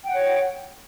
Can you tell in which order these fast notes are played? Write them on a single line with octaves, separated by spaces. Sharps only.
G5 F#5 C#5